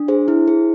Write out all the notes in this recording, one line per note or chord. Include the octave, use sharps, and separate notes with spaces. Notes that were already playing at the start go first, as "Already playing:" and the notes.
Already playing: D4
G#4 C5
E4
G#4